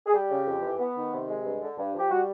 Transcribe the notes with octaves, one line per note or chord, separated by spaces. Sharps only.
G#4
G3 G4
C#3
F2
E3
B3
D#3
C3
G#3
G2
D3
G2
F3 G4
G3 F#4